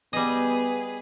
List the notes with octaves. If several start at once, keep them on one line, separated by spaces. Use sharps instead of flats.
G3 B3 G#4 B4 D#5